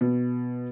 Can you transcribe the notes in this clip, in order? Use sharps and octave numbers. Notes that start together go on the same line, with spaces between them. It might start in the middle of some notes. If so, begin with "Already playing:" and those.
B2